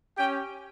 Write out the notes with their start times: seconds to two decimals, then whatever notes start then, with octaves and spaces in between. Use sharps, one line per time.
0.18 C#4 G4 G5